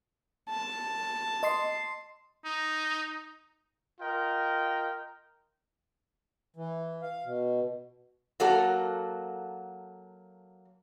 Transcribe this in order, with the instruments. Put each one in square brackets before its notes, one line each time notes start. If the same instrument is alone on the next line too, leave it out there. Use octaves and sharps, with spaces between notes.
[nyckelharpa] A5
[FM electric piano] D#5 C6 C7
[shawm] D#4
[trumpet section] F4 A#4 D#5 G5
[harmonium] E3
F5
B2
[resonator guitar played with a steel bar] F#3 A#3 F#4 A4